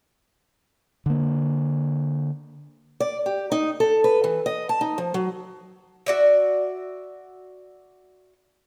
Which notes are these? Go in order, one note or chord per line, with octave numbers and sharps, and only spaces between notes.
D3 A#3
D5
G4
D#4
A4
B4
E3
D#5
A5
D#4
F3
F#3
F#4 D5 E5